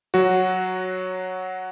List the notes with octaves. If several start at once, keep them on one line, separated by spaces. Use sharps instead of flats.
F#3 F#4